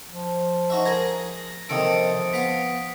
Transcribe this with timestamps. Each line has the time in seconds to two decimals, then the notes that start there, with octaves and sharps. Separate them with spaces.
0.08 F3
0.70 D#4 F#4 E5
0.85 G#4 A#4 G#6 A#6
1.69 D#2 C3 F3 A4 D#6 C#7 D7
2.33 B3 F5 B6